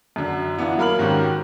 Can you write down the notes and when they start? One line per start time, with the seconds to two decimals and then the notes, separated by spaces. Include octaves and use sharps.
0.16 F#2 D3
0.57 E3 B3 D4 E4 F4
0.78 F#3 A#3 A#4 B5 F6 F#7
0.99 G#2 D#3 C4 C#4 F#4 G4